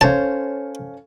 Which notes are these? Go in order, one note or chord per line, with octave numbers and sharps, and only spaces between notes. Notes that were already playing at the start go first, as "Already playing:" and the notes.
C#4 A4 C5 C#5 F5 A5